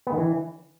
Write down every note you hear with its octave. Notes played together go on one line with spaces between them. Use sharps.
B3
D#3
E3